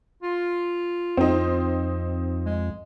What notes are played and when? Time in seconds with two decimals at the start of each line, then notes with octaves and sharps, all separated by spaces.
0.23 F4
1.17 F2 C4 D#4
2.46 G#3